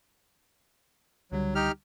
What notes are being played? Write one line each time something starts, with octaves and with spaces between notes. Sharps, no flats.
C#2 D3 F#3 G3
D#4 G4 F6